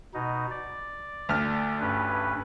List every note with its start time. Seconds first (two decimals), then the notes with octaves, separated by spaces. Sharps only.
0.14 B2 D#4
0.51 D5
1.29 D2 F6
1.81 G2 C#4 B4